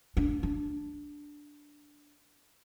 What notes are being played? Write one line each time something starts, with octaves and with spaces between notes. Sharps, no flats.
D4
D4